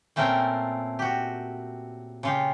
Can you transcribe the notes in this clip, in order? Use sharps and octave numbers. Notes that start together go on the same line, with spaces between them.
A#2 A3 C4 C#4 A#4 G5
F#4 G4
C#3 F4 G4